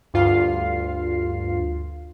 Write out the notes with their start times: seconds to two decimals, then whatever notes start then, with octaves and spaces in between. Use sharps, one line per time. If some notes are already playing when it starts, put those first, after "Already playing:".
0.14 D2 G2 F4 F5 C7